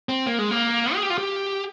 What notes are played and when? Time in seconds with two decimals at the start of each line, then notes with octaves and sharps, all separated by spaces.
0.09 C4
0.26 A#3
0.39 G#3
0.51 A#3
0.95 G#4
1.03 G4
1.10 F4
1.18 G4